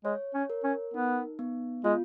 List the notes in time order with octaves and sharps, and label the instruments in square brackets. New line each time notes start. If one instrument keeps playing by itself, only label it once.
[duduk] G#3 [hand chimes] C#5
[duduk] C#4
[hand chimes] A#4
[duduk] C#4
[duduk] B3 [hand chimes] D#4
[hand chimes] B3
[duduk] G#3 [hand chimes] F4